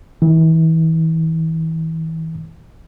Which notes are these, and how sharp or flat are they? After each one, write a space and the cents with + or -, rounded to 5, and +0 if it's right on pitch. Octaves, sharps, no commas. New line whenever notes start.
E3 -35